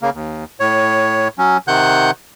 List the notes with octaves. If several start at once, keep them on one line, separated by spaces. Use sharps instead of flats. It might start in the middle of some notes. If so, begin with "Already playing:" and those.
C#3 A#3
D#2
A2 C#5
F#3 C#4
C3 D#3 F#5 F#6 G6